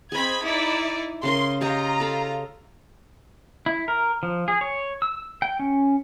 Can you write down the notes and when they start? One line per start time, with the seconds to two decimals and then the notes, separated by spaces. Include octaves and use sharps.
0.12 C4 G#4 D#5 B5 G#6
0.41 D#4 E4 D5
1.23 C#3 C#4 A#4 C6
1.61 F4 G4 C#5 D#5 A#5
2.00 A4 F5 B5
3.66 E4
3.88 A#4
4.23 F3
4.48 G#4
4.61 C#5
5.02 E6
5.42 G5
5.59 C#4